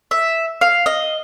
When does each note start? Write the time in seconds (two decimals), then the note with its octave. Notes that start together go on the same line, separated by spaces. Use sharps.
0.11 E5
0.61 F5
0.86 D#5